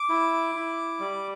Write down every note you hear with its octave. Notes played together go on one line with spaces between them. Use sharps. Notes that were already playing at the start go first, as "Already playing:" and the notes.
Already playing: D6
E4
E4
G3